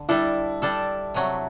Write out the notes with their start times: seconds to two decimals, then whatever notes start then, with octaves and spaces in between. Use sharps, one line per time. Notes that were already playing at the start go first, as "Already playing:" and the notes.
Already playing: D3
0.09 G3 D4 E4 A4
0.62 G3 D4 A4
1.14 C3 F#3 A3